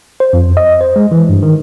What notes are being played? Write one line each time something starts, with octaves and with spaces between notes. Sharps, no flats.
C5
F2
D#5
C5
G#3
E3
G2
D#3